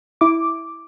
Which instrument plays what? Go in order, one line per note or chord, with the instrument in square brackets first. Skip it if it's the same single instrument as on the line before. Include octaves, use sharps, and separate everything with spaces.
[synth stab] E4 D6